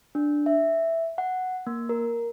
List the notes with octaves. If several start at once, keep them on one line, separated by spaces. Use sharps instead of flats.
D4
E5
F#5
A#3
A#4